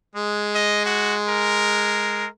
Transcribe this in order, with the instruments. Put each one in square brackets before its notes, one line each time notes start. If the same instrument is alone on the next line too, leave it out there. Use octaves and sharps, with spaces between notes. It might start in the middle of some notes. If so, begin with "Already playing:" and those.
[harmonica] G#3
[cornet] D#5
F#4
A#4